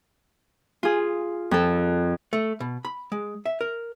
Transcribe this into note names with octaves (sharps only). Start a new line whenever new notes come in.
F4 G#4
F2 A4
A3
B2
B5
G#3
E5
A#4